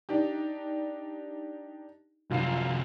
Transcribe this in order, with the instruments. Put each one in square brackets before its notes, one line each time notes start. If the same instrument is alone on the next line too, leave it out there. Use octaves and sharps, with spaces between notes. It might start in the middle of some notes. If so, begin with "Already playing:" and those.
[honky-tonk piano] D4 D#4 G4
[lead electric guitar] C2 F3 [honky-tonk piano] F#2 F4 C7